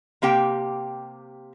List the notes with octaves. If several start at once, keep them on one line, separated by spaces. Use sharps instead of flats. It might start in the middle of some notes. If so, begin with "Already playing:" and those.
C3 A#3 G4 G5